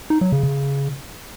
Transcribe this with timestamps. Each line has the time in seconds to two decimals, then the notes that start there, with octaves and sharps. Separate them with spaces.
0.10 D#4
0.21 F#3
0.32 C#3
0.43 C#3